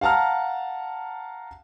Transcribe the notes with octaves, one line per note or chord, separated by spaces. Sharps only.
F5 F#5 A5 A#5 F6